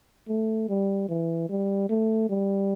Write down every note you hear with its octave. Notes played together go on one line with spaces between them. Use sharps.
A3
G3
E3
G3
A3
G3